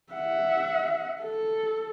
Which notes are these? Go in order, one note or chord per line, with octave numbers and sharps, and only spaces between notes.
E5 F#5
A4